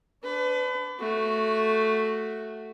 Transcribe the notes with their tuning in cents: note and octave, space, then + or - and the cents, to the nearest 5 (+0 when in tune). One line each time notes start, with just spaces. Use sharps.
D4 -15 B4 +35
A3 +0 F#4 +0